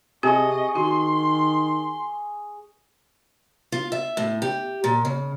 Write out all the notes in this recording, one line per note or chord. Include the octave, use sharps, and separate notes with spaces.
C3 C4 G4 G#4 D#5 C#6
D#3 F#4 C6
F4
E5
A2
G4
A#2
C#3